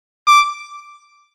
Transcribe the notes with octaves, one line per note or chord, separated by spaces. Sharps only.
D6